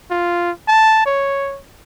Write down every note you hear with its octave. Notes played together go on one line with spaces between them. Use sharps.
F4
A5
C#5